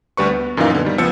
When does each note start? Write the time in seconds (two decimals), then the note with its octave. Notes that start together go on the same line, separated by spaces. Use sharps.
0.17 D2 G3 B4 C#6
0.30 B3
0.57 F#2 A#2 D#3 E3 D#4 F5
0.70 D3 B3
0.85 D#3 G3
0.98 C#2 F3 B3 E6 C#7